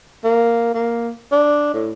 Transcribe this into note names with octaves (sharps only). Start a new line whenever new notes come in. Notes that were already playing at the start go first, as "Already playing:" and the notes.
A#3
A#3
D4
A2